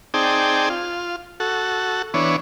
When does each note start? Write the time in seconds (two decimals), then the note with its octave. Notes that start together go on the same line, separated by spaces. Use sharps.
0.14 C4 D#4 G#4 D5 G5 A5
0.70 F4
1.40 F#4 A4
2.14 E3 B3 D4 C#5